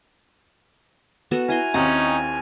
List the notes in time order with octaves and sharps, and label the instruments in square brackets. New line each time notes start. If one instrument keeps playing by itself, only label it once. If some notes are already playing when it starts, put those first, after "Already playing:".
[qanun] B3 F#4 A4
[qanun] E4 A#5 C6 [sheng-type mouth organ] G#5 F6
[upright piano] D#2 C4 [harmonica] C#4 D#4 [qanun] F#5